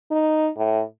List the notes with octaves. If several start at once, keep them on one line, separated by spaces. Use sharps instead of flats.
D#4
A2